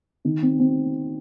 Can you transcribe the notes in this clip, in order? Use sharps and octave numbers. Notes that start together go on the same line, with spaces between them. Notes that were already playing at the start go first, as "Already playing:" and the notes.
D#3
C4
C4